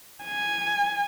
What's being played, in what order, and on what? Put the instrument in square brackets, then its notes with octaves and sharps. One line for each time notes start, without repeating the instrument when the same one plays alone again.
[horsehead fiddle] G#5